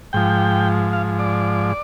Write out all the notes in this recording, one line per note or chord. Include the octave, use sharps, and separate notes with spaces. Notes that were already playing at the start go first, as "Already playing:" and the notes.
G#2 F3 G5
F5
D5